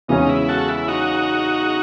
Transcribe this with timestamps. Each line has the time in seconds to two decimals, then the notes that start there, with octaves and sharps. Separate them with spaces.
0.08 E2 C#3 E3 G#3 C#4 D#4
0.29 E4
0.49 F#4 A4
0.68 E4
0.88 D#4 F#4